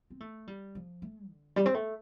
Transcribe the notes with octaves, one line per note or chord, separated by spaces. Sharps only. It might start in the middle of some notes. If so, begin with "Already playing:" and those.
C4
A3
G3
F3
A3
D3
G3
C4
A3